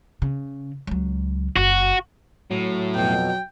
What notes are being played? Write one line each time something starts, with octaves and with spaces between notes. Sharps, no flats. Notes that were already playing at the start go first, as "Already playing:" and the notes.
C#3
C#2 F#3
F#1 F#4
A2 F#3
F2 B2 G5